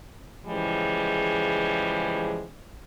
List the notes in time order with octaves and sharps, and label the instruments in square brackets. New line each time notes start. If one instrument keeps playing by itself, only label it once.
[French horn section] C#3 E3 F3 G3 G#3